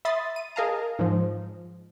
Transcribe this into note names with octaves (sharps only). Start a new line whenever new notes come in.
E5 B5 C6 D#6 A6 C7
D#7
G#4 A#4 D#5 F5 A5 A#5
G#2 F3